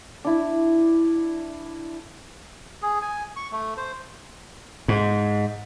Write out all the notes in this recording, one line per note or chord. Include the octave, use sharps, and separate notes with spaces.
D4 E4
G#4
G#5
C#6
A3
C5
G#2